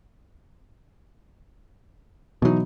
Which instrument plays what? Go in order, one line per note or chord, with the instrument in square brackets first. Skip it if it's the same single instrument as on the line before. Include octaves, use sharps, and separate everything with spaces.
[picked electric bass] B2 F#3 [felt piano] E3 D#4